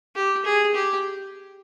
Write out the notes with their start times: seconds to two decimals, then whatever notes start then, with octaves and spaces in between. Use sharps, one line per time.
0.15 G4
0.45 G#4
0.74 G4